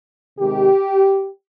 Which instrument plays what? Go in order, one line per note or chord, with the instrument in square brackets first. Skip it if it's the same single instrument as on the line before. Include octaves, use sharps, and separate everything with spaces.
[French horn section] C3 D#3 G#3 G4